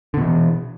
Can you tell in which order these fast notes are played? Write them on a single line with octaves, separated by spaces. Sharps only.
D3 B2 E3